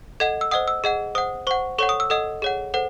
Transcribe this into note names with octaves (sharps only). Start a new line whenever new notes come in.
A4 D#5 F#5 G#6
E6
C5 D#5 F#5 D#6
E6
G#4 D#5 F#5
C5 F#5 D#6
C5 F#5 C#6
A4 C#5 F#5 C#6
D#6
E6
A4 D#5 F#5 D#6
G#4 C#5 F#5
A4 C5 F#5